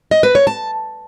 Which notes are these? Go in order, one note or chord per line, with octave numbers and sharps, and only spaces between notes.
D#5
B4
C#5
A5